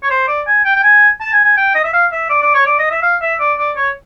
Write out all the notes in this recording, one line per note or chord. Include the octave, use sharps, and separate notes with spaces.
C#5
C5
D5
G#5
G5
G5
G#5
A5
G#5
G#5
G5
D#5
E5
F5
E5
D5
D5
C#5
D5
D#5
E5
F5
E5
D5
D5
C#5